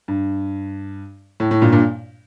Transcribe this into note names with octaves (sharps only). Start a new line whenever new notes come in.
G2
A2
A2
G2 A#2
G2 A#2